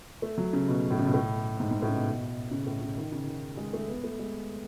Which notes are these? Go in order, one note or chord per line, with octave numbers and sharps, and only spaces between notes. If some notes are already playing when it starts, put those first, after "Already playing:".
A3
F#3
C#3
B2
A2
C#3
B2
A2
G#2
G#2
A2
C#3
B2
C#3
A2
C#3
D#3
C#3
D#3
G#3
A3
B3
A3
G#3